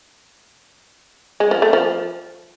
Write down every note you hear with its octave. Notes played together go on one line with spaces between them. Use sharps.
G#3
F3
A3
F3